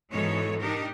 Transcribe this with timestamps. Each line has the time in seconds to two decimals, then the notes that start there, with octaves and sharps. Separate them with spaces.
0.11 G#2 B2 E3 D#4 A4 C#5
0.60 D4 D#4 G4 A#4